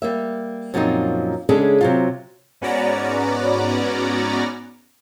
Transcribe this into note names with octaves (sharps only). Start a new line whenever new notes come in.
G3 A#3 E5
F#2 A#2 F3 C4 D4 D#4
C#3 G#3 C#4 D4 G#4 A4
C3 F#3 F4
G#2 B3 C#4 F#4 D5 A#5